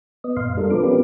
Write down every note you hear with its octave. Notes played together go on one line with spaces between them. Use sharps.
B3 D#5
F#2 A#2 F5 C6
G3 G#3 D4 A4 A#4
F3 C4 F4 B4 D6
B3 C#4 G4 A#4 B4